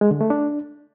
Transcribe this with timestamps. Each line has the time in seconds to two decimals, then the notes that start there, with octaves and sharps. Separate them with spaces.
0.01 G#3
0.11 D3
0.21 A3
0.30 D4